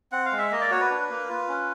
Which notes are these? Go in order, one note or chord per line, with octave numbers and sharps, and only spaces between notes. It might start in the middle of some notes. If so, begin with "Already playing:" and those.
C4 F#5
F5
G#3
E5
A#3 D#5
D5
F#4 C#5
B4
D4
A#3
F4
C#4